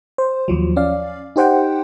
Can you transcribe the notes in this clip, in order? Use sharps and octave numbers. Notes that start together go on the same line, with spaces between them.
C5
D#2 F3 F#3
C#4 D5 F5
D#4 G4 C5 F#5 G5